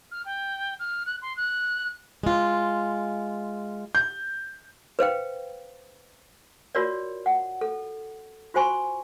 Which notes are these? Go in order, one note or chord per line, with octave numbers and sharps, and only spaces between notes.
F6
G5
F6
F#6
C6
F#6
G#3 F4
G6
B4 C5 F5 G5
F4 F#4 A#4 C#5 D5
F#5
A4
F4 F#4 C5 G#5 C6 C#6